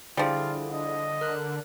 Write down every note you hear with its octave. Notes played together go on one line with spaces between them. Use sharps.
D3 F3 G3 E4 F4 G#4
D#5
A#4 F#6